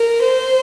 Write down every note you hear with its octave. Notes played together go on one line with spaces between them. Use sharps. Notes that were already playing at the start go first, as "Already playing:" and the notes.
Already playing: A#4
C5